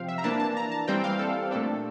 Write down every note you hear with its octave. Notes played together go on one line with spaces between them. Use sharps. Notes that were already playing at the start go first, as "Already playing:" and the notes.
Already playing: C3 F3 C4 F5 G5
E5
A#5
E3 A#3 D4 A5
A5
A#5
A5
E3 G3 C4 G5
F5
A4
A#2 A3 D4 A4